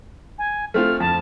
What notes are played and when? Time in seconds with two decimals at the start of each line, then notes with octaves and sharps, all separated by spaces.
0.38 G#5
0.74 A3 C4 F4 F6
1.00 F2 A5